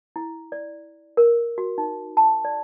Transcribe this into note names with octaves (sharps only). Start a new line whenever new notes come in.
E4
D5
A#4
F#4
D#4
A5
D5